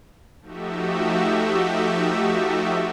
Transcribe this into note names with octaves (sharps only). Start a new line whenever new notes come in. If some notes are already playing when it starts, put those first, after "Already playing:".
F3 A3 D#4 F#4 G4 E5